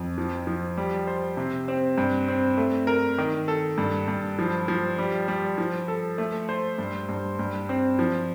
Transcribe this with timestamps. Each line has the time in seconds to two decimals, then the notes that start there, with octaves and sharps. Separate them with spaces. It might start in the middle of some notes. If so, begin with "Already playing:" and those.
Already playing: F2
0.18 F3
0.47 F3
0.77 G3
1.07 C5
1.37 C3
1.68 C4
1.98 G2
2.28 C4
2.58 A3
2.87 A#4
3.18 D#3
3.48 A4
3.78 G2
4.08 G2
4.39 F3
4.68 F3
4.98 G3
5.28 G3
5.58 F3
5.88 A4
6.18 A3
6.49 C5
6.78 G2
7.09 G2
7.39 G2
7.69 C4
7.99 F3